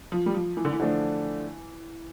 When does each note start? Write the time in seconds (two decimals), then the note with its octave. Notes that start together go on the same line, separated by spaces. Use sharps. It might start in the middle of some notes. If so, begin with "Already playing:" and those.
0.12 F3
0.26 G3
0.34 F3
0.57 E3
0.65 D3
0.72 E3
0.80 D3 F3 A3 D4